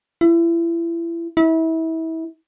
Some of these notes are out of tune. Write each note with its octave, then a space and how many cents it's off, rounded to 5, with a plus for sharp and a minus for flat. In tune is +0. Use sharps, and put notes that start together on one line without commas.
E4 +30
E4 -30